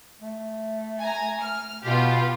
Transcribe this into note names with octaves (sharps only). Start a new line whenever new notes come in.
A3
G#5 A#5
F6
B2 B3 F4 G4